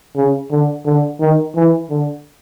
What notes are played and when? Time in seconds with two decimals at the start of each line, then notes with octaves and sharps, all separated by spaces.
0.16 C#3
0.51 D3
0.86 D3
1.21 D#3
1.56 E3
1.90 D3